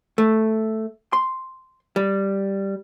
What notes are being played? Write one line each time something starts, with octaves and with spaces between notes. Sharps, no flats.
A3
C6
G3